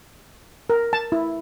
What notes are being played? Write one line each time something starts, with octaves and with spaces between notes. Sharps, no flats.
A#4
A5
E4